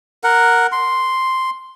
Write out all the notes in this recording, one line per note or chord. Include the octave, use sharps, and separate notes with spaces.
A#4 F#5
C6